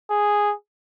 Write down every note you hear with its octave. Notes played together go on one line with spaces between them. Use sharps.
G#4